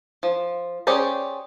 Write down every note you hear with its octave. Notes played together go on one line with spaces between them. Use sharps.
F3
C#4 G4 G#4 C5 D5